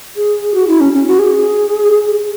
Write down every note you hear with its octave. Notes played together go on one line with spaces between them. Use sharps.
G#4
F#4
E4
C#4
C#4
F#4
G#4